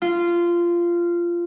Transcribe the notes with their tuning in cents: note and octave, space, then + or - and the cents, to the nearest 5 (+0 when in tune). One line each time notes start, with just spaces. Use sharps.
F4 -15